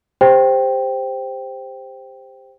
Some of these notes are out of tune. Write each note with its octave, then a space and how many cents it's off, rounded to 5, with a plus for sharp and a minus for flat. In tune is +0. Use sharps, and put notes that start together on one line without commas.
G4 +25 C5 +0 G5 +0